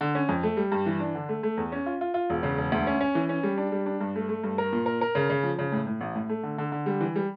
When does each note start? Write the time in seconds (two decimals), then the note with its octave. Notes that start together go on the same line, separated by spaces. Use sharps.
0.01 D3
0.15 C#4
0.29 F2
0.43 A3
0.57 G3
0.72 G2
0.86 E3
1.00 D4
1.15 D3
1.29 A3
1.43 A3
1.57 E2
1.72 C#4
1.86 F4
2.01 F4
2.14 F4
2.30 E1
2.43 C#3
2.58 E1
2.72 D2
2.87 C#4
3.00 C#4
3.15 E3
3.29 C#4
3.43 G3
3.58 D4
3.72 G3
3.86 D4
4.00 G2
4.16 A3
4.29 A3
4.44 G2
4.58 A#4
4.73 A#2
4.86 A#4
5.01 A#4
5.15 C#3
5.30 C#3
5.43 F3
5.59 C#3
5.72 A2
5.87 A2
6.01 A1
6.16 A2
6.29 A3
6.43 D3
6.58 D3
6.72 D3
6.86 G3
7.01 E3
7.16 G3